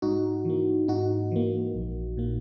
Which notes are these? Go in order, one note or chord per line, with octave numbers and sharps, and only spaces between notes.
G#2 D#4 F#4
E3 A#3
G#2 D#4 F#4
E3 A#3
A#1
A#2 A#3